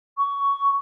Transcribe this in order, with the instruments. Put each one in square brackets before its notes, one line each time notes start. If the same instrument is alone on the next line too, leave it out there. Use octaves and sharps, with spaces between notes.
[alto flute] C#6